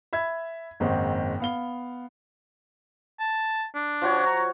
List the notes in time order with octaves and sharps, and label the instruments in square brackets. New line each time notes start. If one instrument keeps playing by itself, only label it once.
[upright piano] E5 B5 G#6
F#1 G#2 D#3 C4
B3 F5 G7
[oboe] A5
D4
[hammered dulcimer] F3 F#4 C#5
[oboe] A#5